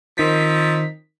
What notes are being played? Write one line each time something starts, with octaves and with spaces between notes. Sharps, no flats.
D#3 F3 C4 D#4 B6